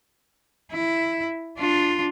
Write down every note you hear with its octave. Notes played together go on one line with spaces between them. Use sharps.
E4
D4 F4